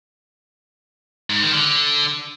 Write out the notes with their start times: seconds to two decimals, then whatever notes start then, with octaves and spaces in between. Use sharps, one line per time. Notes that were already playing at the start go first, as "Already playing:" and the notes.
1.30 G#2
1.42 D#3
1.53 D3